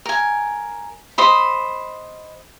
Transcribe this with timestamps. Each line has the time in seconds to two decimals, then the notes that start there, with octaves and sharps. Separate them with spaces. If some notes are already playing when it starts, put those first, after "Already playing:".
0.06 A#4 G#5
1.18 C5 D#5 B5